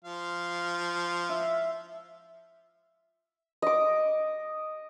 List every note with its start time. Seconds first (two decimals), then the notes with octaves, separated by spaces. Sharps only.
0.05 F3 F5
1.29 E5
3.62 D#5 D6